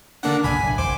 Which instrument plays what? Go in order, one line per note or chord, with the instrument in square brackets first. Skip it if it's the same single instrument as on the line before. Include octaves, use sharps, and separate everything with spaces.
[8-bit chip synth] D3 A#3 F#5 [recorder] D4
[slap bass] B1 G#2 C#3 [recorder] G#5 [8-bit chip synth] B5
[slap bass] B1 A2 F#3
[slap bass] G#1 F2 C#3 [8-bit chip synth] C5 D6